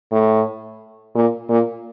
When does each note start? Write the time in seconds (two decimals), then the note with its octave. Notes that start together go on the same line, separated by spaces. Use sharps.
0.11 A2
1.15 A#2
1.50 A#2